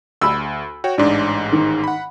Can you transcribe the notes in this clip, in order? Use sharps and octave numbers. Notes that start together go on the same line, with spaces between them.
D2 B5 E6
F#4 C#5 G5
A1 G#2 D4
D#3
F#5 B5